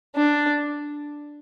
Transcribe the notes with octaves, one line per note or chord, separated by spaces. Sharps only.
D4